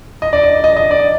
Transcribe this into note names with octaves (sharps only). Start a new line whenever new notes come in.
D#5
D5
D#5
D#5
D#5
D5